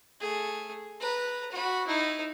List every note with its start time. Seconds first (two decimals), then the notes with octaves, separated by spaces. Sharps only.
0.20 A3 G#4
1.00 B4 A#5
1.51 F#4 B5
1.86 D#4 E4